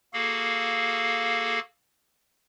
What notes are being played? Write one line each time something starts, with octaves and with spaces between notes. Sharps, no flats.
A#3 F#4 G#4 A4 F5